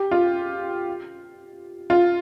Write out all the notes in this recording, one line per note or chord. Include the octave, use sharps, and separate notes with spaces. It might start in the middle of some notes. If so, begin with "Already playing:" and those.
Already playing: G4
F4
F4